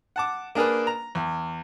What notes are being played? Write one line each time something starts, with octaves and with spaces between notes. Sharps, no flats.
F#5 A5 D6
A#3 D4 G#4 A#4 B4
A#5
E2